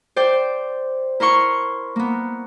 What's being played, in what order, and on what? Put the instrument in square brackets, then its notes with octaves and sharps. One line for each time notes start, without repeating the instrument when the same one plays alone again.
[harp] C5 D5 G5
E4 A#4 C6 C#6
A#3 B3